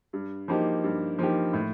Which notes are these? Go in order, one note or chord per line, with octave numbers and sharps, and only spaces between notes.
G2
F3 A#3 D#4 G4
G2
F3 A#3 D#4 G4
A2